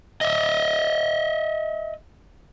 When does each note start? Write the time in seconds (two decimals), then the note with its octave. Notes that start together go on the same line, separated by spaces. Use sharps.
0.21 D#5 E5